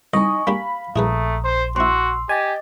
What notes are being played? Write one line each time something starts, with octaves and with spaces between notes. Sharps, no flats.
C2 D#4 D#5 G#5 C#6
A#3 D4 G4 F5 B5
A#1 A3 E4 G#4 B4 A#5 D#6
C5 C6
C4 E4 F#4 C6 E6
G4 D#5 G#5 D6 A6